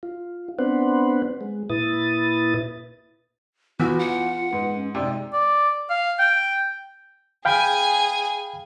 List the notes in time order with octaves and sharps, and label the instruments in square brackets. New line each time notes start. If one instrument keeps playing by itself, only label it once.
[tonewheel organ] F4
B3 C4 D4 B4 C5 F#5
G#3
A#2 E4 B4 D#6 A6
[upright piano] E2 [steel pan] E3 B3 [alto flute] F4 [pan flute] F#4
[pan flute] F#5
[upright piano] G#2 [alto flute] B4
[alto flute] C#4
[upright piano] G#2 C3 [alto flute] D5
[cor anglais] D5
F5
G5
[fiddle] G#4 G#5 [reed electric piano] F5 G5 B5